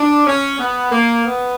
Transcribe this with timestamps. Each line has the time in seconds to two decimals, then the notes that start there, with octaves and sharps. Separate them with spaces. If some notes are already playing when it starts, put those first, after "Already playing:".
Already playing: D4
0.27 C#4
0.59 B3
0.92 A#3
1.26 B3